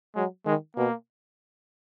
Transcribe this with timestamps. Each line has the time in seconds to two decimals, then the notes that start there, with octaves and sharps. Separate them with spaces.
0.15 F#3 G#3
0.46 D#3 G#3
0.76 B2 A#3